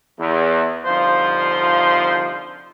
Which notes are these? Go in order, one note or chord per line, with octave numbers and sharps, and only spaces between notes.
E2
C2 D3 F3 D#4 F4 C5